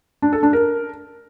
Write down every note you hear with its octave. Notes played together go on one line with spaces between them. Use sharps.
D4
A4
D4
A#4